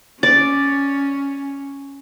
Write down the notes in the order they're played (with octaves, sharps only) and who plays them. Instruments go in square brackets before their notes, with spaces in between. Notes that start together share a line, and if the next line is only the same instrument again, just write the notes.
[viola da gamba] C#4 [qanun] D5